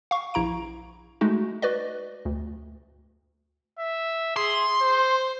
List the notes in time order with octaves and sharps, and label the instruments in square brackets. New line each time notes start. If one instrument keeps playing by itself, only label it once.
[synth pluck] F5 C#6
A#1 E4 A#5 D7
G#3 A3 D#4 F#4
F#4 B4 D5 D#5
D2
[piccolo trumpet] E5
[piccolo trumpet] G#4 [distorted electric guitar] C6
[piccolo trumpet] C5